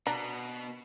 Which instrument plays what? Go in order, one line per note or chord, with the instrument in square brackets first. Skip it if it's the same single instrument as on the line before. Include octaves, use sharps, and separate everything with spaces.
[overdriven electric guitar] B2 [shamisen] D4 [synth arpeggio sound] A#5